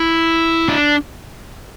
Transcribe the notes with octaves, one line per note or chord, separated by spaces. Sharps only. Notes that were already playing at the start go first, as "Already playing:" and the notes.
Already playing: E4
D4